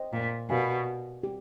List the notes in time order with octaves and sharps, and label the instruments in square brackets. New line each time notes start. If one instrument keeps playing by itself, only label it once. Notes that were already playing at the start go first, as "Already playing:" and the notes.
Already playing: [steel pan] C5 D#5 G5
[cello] A#2
[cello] B2 [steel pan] G4 A#4 D5 F5 G#5
[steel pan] G4